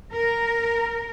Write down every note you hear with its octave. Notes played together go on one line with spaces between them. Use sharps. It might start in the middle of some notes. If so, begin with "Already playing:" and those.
A#4